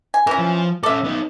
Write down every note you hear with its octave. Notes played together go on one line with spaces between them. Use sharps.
G#5
E3 C#4 A#4
F3
C#4 A4 D5 E5
B3 D#4